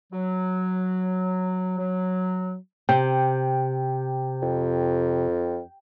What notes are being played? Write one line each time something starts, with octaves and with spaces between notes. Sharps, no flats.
F#3
F#3
C3 G5
F2